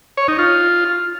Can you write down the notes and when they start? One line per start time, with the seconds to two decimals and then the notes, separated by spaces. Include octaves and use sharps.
0.17 C#5
0.28 D#4
0.39 F4